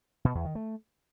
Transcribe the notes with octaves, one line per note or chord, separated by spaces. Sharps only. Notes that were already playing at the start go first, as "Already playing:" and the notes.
B2
E2
D#3
A3